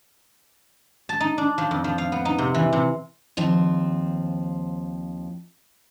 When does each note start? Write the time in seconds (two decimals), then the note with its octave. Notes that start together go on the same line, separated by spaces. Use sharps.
1.09 A5
1.20 D#4
1.38 D4
1.58 F3
1.71 F2
1.84 F3
1.98 F5
2.12 B3
2.25 D#4
2.38 C3
2.54 E3
2.73 C3
3.37 D#2 F3 C4